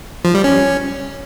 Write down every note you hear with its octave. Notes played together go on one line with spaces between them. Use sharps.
F3
G3
C#4